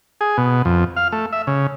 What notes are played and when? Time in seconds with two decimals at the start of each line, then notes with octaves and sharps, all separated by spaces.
0.21 G#4
0.37 B2
0.65 F2
0.96 F5
1.12 A3
1.32 E5
1.47 C#3